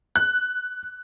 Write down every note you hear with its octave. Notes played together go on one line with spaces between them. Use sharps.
F#6